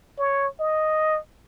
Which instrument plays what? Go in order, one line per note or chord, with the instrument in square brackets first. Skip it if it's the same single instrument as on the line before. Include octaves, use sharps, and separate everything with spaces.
[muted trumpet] C#5
D#5